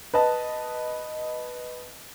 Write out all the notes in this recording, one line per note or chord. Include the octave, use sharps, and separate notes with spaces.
B4 D#5 A5